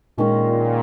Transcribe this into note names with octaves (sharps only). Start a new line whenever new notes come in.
A#2 D#3 G#3 C#4